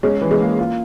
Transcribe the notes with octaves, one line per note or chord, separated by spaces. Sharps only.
G#3 C#4
E3
G#3
A#3
F4